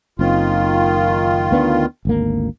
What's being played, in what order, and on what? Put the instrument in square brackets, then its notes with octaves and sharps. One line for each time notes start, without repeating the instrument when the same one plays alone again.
[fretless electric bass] F#1 C4 [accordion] D#3 F4
[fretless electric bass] D2 B3 D4
G#1 D2 A#3